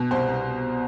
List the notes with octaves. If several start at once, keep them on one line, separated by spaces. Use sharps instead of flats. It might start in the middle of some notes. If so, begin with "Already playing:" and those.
Already playing: B2
C2 C5
C2